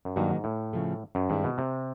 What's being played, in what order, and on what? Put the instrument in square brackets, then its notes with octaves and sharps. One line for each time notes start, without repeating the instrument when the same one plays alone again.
[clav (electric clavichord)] F#2
[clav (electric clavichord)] G2 [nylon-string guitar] D#3 F#3 A#3 D#4 F#4
[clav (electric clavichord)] G#2
A2
[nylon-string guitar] C#3 F3 A3
[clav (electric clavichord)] F#2
[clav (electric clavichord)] G2 [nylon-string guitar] D#3 G#3 C4 E4
[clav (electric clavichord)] B2
C3